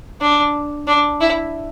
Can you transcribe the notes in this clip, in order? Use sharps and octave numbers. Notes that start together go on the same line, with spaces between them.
D4
D4
E4